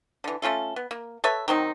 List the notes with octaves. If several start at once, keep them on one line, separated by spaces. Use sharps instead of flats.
D3 E3
A3 C#4 F4 A4
B3
A#3
A4 B4 C#5 E5
D#3 F#3 C4 D#4